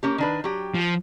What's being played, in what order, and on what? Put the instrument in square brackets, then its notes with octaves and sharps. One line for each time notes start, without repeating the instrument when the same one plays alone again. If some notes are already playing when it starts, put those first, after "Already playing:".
[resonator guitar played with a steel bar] A#3 C#4 G4
D#3 D4 B4
F#3 G4
[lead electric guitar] F3